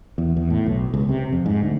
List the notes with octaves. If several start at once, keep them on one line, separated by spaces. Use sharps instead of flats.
E2
E2
A2
B1
C#2
C3
F2
G#2
D2